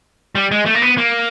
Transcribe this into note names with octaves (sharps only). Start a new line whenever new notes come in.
G3
G#3
A3
A#3
B3
A#3